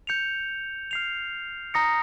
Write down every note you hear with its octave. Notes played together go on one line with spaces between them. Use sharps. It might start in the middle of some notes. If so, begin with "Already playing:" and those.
G6 C#7 F7
F6 C7 F7
A#5 D#6 A#6 C#7